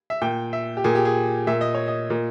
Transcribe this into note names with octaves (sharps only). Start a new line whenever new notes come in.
E5
A#2 G5
E5
G4
A#2 G#4
G4
G#4
A#2 E5
D#5
C#5
D#5
A#2